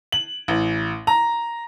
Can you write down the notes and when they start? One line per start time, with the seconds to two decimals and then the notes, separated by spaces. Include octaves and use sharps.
0.12 F#7
0.48 A1
1.07 A#5